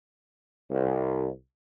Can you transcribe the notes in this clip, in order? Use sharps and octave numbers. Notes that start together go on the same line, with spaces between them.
C2